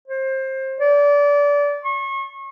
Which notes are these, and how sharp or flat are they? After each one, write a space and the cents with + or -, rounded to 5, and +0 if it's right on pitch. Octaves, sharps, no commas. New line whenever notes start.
C5 +25
D5 -25
C#6 -35